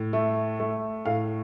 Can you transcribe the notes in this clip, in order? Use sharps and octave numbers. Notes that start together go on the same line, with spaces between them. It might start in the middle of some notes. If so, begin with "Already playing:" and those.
Already playing: A2
A3
A3
A2 F5